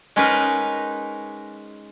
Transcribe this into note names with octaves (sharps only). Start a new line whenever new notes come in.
G#3 C#4 D#4 A#4 B4 F#5